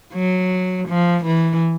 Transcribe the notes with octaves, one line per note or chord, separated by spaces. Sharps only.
F#3
F3
E3